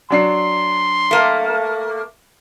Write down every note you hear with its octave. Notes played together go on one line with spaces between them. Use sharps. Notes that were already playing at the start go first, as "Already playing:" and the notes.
F#3 D4 C6 C7
A3 A#3